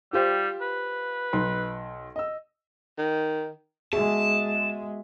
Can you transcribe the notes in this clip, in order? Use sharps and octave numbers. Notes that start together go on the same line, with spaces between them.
G3 F4 G4 C5
B4
B1 D#4 C6
D#5 E6
D#3
G#3 B3 F#4 G#4 E5 A5